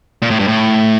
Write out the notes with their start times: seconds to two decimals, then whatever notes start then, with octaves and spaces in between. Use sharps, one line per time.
0.22 A#2
0.30 A2
0.39 G2
0.48 A2